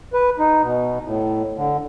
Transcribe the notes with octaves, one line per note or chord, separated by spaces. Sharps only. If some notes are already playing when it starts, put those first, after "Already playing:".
B4
D#4
B2
A2
D3